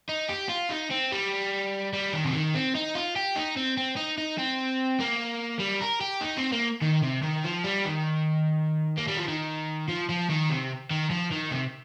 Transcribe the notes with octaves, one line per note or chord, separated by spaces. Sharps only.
D#4
G4
F4
D#4
C4
G3
G3
D#3
C3
D#3
C4
D#4
F4
G4
D#4
C4
C4
D#4
D#4
C4
A#3
G3
A#4
G4
D#4
C4
A#3
D#3
C3
D#3
F3
G3
D#3
A#3
G3
F3
D#3
F3
F3
D#3
C3
D#3
F3
D#3
C3